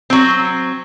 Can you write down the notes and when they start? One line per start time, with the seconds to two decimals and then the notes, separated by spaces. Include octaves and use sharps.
0.10 F#3 C4